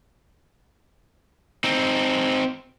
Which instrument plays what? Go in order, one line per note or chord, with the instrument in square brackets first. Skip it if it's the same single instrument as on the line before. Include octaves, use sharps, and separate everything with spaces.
[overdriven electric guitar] C4 D#4